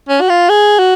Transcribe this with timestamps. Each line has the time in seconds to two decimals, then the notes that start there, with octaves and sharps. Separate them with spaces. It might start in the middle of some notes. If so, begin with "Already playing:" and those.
0.09 C#4
0.21 F#4
0.29 F4
0.49 G#4
0.79 F#4